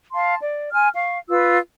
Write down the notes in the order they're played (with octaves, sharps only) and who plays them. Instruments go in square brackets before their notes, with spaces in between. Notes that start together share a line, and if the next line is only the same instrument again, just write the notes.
[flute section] F5 A5 C6
D5
G#5 C6 F6
F5 C#6
F4 B4 E6